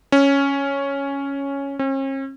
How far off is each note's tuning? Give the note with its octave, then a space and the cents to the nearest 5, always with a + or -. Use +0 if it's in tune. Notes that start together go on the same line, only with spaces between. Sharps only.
C#4 +0
C#4 -45